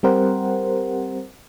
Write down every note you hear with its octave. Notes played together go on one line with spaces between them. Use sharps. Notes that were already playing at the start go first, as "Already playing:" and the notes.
G3 C4 G4 A#4 C5 F#5